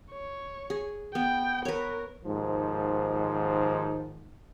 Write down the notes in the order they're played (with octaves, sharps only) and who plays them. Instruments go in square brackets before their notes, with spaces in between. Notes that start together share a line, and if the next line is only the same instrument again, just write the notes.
[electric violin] C#5
[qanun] G#4
[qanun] B3 [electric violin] G5
[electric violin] A#4 [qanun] B4 C#5
[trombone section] D#2 G#2 D#3 F3